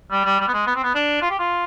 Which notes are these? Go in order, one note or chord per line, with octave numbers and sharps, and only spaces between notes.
G3
G3
G3
B3
G#3
B3
C4
B3
D4
F4
G4
F4